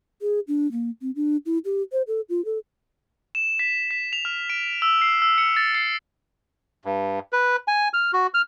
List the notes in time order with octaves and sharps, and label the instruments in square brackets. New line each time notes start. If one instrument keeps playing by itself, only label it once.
[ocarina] G#4
D4
A#3
C4
D4
E4
G4
C5
A4
F4
A4
[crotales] E7
B6
B6
F7
F6
D7
E6
C7
E6
C#7
A6
C7
[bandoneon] G2
B4
G#5
F6
F#4
F6